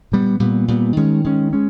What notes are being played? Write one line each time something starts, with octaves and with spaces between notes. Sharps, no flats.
A#2 G3 B3
A#2 G3 B3
A#2 G3 B3
D#3 G#3 C#4
D#3 G#3 C#4
G#3 C#4